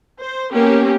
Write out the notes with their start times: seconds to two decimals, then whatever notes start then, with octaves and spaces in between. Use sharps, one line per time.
0.21 C5
0.53 A#3 B3 C#4 G4